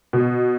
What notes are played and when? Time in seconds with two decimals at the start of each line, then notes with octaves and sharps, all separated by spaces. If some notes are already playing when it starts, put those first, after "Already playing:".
0.13 B2